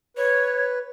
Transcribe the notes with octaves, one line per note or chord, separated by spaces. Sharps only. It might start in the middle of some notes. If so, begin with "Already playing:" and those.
B4 C#5